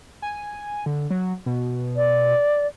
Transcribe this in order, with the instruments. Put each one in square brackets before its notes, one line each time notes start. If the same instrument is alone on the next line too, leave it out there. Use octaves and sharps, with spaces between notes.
[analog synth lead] G#5
D3
F#3
B2
[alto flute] D5